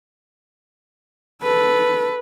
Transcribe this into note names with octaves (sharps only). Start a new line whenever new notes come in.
A4 B4